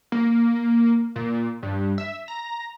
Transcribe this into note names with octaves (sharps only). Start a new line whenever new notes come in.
A#3
A#2
G2
E5
A#5